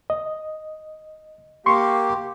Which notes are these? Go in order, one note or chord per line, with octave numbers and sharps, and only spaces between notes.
D#5
A#3 G4 C6 C#6